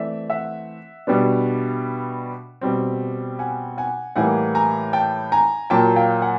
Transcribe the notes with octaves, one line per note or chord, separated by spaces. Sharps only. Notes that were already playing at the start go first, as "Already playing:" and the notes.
Already playing: E3 A3 C4 D5 E5
E5 F#5
B2 G3 B3 D4
B2 G3 C4
F#5 G#5
F#5 G#5
A2 E3 G3 A#3 F#5 G#5
G#5 A#5
G5 A5
G#5 A#5
A#2 F#3 A#3 G5 A5
F5 G5
F#5 G#5